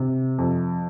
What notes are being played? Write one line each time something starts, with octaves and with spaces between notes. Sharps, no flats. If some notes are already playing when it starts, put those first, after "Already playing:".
Already playing: C3
F2